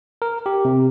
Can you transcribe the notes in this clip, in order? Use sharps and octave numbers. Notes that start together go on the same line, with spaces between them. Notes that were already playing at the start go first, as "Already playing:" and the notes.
A#4
G4
C3